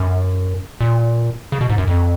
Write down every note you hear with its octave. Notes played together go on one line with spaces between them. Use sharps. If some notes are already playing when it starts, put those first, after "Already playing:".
Already playing: F#2
A#2
C#3
B2
G#2
F#2
F2